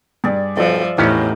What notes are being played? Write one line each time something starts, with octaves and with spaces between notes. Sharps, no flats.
G2 G#4 D5
B1 F3 D5 E5
E2 A2 B3 C#4 D#4 G4 F5